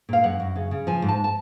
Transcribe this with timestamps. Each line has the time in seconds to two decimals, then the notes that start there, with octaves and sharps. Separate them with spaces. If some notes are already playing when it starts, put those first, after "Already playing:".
0.09 A#2 F5
0.24 F#2 F#5
0.40 F#2
0.56 C#3
0.71 C#3
0.87 F3 G#5
1.02 G#2
1.09 A5
1.24 A5